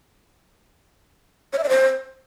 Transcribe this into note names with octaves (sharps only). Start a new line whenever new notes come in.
C#5
E5
D5
C5